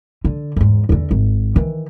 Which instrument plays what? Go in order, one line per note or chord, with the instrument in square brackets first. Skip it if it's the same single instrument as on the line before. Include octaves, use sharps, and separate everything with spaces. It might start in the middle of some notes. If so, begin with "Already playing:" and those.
[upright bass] D3
E2 G#2
E2 D3
G#1
D#3 E3